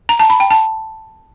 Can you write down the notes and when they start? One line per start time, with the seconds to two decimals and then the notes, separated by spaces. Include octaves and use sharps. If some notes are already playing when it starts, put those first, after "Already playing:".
0.09 A#5
0.19 A5
0.30 B5
0.40 G5
0.50 A5